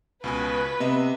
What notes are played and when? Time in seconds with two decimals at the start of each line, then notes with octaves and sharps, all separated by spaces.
0.24 C#2 B2 B4 G#5
0.80 C3 B3 D#5 E5